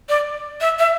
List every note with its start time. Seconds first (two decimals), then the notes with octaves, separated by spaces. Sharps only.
0.09 D5
0.61 E5
0.79 E5